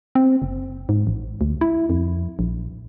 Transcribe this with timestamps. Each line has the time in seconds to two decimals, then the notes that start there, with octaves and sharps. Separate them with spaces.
0.15 C4
0.42 F#1
0.89 G#2
1.07 A1
1.41 D2
1.61 E4
1.90 F2
2.39 A#1